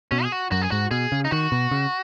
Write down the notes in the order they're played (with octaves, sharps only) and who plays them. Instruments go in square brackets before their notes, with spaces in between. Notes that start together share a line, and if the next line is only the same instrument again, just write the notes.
[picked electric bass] B2 [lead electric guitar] C#4
[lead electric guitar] G#4
F#4
[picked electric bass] F#2 [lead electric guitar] F#4
[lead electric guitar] G#4
[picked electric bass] G#2 [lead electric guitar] F#4
[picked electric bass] B2 [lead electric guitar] G#4
[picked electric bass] C#3
[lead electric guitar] D#4
[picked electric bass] D#3 [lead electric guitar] F#4
[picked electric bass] B2
C#3